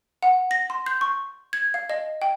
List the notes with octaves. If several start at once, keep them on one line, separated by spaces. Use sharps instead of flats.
F#5
A#6
C6
G6
C#6
G#6
F5
D#5
G5